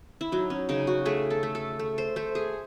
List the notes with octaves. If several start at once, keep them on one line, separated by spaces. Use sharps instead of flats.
E4
F#3 D#4
C#4
C#3 D#4
F#4
A3 G#4
A4
A3
A4
A3
C5
A3 C5
G#4